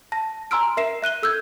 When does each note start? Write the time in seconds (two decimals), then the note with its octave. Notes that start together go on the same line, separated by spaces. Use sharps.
0.12 A5 A#6
0.51 G#5 A#5 C6 E6 F6 D7
0.77 A#4 E5 C7 E7
1.02 E5 F#6 D#7 G7
1.23 A4 E6 F6 G6 G#6